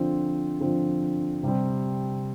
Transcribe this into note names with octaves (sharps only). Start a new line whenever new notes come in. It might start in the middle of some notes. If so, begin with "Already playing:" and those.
Already playing: D3 F3 C4
D3 F3 C4
C3 G3 C4